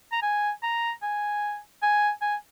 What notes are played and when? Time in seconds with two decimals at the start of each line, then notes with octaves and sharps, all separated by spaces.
0.12 A#5
0.23 G#5
0.63 A#5
1.02 G#5
1.83 G#5
2.21 G#5